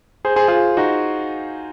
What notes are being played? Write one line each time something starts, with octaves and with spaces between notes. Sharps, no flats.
G#4 C5
G#4 C5
F4 G#4
D#4 F#4